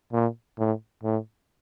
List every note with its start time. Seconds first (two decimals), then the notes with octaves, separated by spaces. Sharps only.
0.13 A#2
0.59 A2
1.04 A2